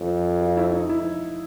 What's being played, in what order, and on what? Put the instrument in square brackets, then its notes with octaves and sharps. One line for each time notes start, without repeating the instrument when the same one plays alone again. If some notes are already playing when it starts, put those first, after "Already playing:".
Already playing: [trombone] F2
[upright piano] F4
E4
D#4
E4